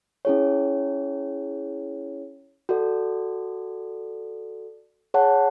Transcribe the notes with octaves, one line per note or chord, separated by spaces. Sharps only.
C#4 E4 G#4 C#5
F#4 A4 D5
G#4 C#5 F#5 A5